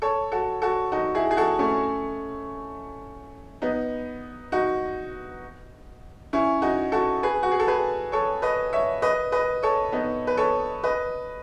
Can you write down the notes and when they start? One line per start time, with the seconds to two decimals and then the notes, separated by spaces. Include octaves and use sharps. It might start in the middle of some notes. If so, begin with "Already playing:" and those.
0.02 A4 C#5
0.32 F#4 A4
0.62 F#4 A4
0.92 D#4 F#4
1.15 E4 G#4
1.31 G#4
1.37 F#4 A4
1.59 A3 C#4
3.62 B3 D#4
4.52 D#4 F#4
6.33 C#4 E4
6.62 D#4 F#4
6.92 F#4 A4
7.23 G#4 B4
7.43 F#4
7.52 G#4
7.60 A4
7.67 G#4 B4
8.12 A4 C#5
8.42 B4 D#5
8.73 C#5 E5
9.02 B4 D#5
9.32 B4 D#5
9.63 A4 C#5
9.92 B3 D#4
10.27 B4
10.37 A4 C#5
10.83 B4 D#5